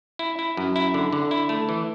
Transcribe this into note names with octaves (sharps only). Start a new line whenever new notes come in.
E4
E4
F#2
E4
D3
D3
E4
A3
E3